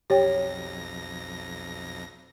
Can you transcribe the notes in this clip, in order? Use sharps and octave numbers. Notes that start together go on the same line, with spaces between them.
B1 F2 G4 C#5 G5 A#6